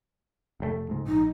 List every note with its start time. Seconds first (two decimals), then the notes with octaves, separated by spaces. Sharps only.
0.60 F1 G#2 A3
0.89 C#2 G#2
1.07 A#1 D#4